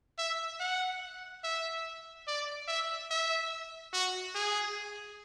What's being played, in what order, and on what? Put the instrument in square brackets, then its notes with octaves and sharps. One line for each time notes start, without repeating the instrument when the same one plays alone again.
[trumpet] E5
F#5
E5
D5
E5
E5
F#4
G#4